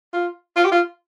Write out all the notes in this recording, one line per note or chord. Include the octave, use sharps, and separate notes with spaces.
F4
F4
G4
F4